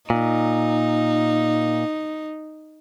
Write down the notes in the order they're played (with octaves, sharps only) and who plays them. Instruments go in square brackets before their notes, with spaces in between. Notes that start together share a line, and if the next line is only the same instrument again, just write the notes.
[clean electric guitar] A#2 [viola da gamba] D#4